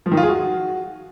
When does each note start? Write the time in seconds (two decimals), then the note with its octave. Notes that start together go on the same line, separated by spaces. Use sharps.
0.06 F3
0.12 D#3
0.17 F4
0.23 G#4
0.29 F#4